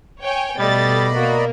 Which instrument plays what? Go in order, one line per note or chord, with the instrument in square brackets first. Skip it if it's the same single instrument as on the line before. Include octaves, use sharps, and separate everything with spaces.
[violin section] C#5 G5 G#5
[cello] B2 [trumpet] G3 [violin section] A3 A6 [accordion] D5 D#5 B5
[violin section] A#3 A#4 [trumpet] F#4